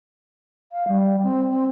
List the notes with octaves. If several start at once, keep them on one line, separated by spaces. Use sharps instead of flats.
F5
G3
C4
C4